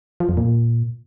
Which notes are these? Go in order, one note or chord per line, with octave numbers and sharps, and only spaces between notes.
F3
F2
A#2